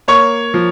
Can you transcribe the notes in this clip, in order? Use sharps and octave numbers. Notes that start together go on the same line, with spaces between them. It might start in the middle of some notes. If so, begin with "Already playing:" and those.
A#3 C#5 C#6
F3